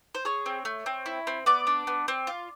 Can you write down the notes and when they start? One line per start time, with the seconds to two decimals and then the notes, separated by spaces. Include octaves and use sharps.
0.15 C5
0.25 G#4 C#5
0.46 C4
0.65 A3
0.86 C4
1.06 E4
1.27 C4
1.46 B3 D5
1.67 D4
1.87 B3
2.08 C4
2.27 F4